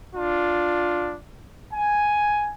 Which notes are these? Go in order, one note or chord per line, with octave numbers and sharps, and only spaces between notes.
D4 F4
G#5